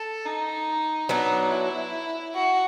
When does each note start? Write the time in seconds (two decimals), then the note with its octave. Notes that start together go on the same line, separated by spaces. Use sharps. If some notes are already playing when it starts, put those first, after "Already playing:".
Already playing: A4
0.26 D#4
1.09 F#3 B3 D4 D#4
1.51 E4
2.34 F#4